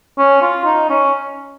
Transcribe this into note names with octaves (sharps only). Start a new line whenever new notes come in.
C#4
F4
D#4
C#4